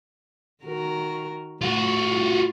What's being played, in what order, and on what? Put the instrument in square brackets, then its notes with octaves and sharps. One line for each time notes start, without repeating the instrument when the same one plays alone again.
[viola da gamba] D#3 F#4 A#4
[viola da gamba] A2 [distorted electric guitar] F4 F#4